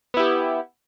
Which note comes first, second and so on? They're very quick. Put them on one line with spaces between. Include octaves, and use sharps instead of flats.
B3 E4 G4